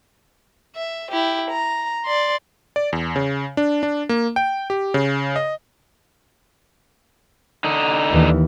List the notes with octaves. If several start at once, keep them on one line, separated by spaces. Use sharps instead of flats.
E5
E4 G4
A#5
D5 C6
D5
E2
C#3
D4
D4
A#3
G5
G4
C#3
D#5
D3 D#4
D#2 E3